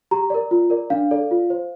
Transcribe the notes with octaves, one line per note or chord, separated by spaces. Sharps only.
G4 A#5
A#4 D5
F4
A#4 D5
D4 F5
A4 D5
F4
C5